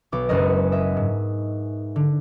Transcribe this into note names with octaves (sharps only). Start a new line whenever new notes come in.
B1 D6
F#1 F#2 F#3 G#3 A#4 D#5
D#5 E5
G#2
D3